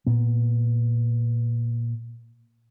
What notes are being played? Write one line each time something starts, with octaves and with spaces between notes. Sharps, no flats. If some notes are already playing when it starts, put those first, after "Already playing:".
A#2 B3